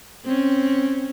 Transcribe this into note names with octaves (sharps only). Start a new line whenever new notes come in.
C4 C#4